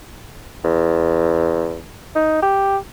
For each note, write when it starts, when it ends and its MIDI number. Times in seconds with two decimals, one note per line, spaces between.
0.64 1.79 40
2.15 2.39 63
2.43 2.78 67